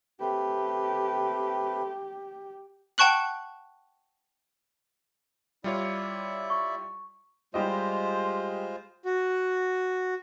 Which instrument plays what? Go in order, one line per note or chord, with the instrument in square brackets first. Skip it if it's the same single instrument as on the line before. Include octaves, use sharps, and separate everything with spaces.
[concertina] A3 C4 B4 [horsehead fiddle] G4
[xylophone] F#5 G5 A5 C#6 F#6 F#7
[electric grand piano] G3 F4 C#5 [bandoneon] E4 D5 E5
[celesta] C#6
[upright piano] G3 G4 D#5 [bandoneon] G#3 F4 C5
[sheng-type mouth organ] F#4